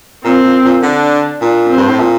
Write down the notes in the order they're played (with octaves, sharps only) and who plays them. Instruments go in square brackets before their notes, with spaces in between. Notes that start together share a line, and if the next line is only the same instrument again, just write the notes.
[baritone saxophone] A#2 [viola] C4
[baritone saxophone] A#2
A#2
[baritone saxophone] D3 [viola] D4
[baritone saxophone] A#2 [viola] D4
[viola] C4
[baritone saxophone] G2
A2
A#2